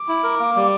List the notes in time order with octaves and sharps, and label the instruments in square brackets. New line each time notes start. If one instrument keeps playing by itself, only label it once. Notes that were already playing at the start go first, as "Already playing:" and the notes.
Already playing: [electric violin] D6
[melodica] E4
A#4
A#3
G3